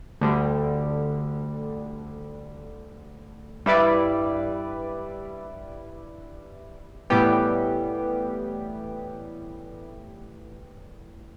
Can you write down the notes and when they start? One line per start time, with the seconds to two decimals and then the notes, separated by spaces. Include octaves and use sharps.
0.21 D2 D3 G3
3.66 G2 G3 E4 B4 D5
7.10 A2 E3 G3 B3 G4